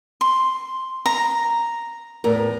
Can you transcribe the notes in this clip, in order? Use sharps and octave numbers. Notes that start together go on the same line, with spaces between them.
C6
A#5
E2 A2 A#4